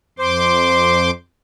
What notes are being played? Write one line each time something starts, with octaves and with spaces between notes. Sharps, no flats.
F2 C5 C6 D6